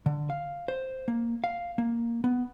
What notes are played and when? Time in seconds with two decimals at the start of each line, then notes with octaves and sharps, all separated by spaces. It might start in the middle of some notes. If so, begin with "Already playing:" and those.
0.06 D3
0.30 F5
0.68 C5
1.08 A#3
1.44 F5
1.78 A#3
2.24 B3